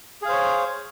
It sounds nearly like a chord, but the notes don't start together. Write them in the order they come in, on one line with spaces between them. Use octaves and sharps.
G#4 F5 C5 C#5